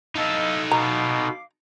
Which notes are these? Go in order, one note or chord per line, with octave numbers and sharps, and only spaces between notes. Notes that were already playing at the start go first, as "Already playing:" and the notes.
D#4 E4 A4 D#5 F5
B2 F5 A#5 D6